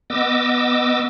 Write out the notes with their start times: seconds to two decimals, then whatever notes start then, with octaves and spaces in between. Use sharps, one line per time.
0.10 B3 D#5 D6 E6